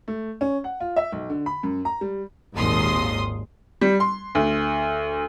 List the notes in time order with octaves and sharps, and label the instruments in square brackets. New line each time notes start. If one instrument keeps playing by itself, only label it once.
[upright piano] A3
C#4
F#5
F4
E5
B1
D3
B5
F#2
A#5
G3
[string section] G#1 D#2 A#2 C6 D#6
[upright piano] G3
C6
D2